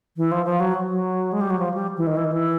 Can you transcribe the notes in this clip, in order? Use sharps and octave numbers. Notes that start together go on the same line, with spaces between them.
E3
F3
F3
F#3
F#3
G#3
G3
F#3
F3
G3
E3
D#3
E3
D#3
E3